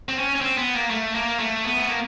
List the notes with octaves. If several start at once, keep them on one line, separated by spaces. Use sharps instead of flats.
C4
C#4
C#4
C4
B3
A#3
A3
A#3
A3
B3
A3
A#3